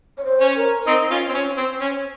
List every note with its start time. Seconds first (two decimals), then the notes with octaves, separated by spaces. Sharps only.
0.18 C#5
0.25 C5
0.40 C#4
0.56 A#4
0.87 C4 D#4
1.11 C#4 F4
1.29 C4
1.34 C#4
1.57 C4
1.81 C#4